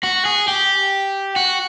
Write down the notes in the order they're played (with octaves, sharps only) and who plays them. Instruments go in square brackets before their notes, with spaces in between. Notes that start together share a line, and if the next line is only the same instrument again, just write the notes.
[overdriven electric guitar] F#4
G#4
G4
F#4